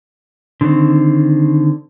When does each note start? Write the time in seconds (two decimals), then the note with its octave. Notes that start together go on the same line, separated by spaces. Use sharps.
0.61 D3 D#3 C4